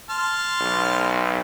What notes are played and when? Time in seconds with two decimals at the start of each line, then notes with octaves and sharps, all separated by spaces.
0.10 A5 C6 F6
0.61 B1